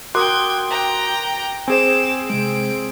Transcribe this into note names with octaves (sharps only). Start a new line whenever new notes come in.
F#4 A#4 G5 C6 D6 D#6 F#6 G#6
G5 A#5
C4 G#4 C5 G#5 D6 E7
C3 G#3 D7